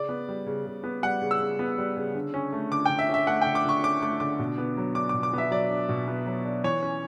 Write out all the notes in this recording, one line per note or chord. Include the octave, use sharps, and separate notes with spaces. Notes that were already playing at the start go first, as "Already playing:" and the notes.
Already playing: C#3 D5
B3
G3
C#3
C#3
B3
G3 F#5
C#3
E6
C#3
B3
G3
C#3
D3
C#4
A3
D3 D6
D3 G5
E5
C#4
E5
A3 F#5
D3 G5
D6
D3 C#6
C#4 D6
A3 D6
D3 D6
B2
B3
F#3
D4 D6
B2 D6
D6
B3 E5
F#3 D5
D4
B2
B3
F#3
D4
E3 C#5
C#4